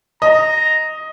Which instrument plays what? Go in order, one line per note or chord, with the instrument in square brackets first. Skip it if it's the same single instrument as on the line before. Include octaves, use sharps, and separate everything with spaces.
[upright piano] D#5 [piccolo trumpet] A#5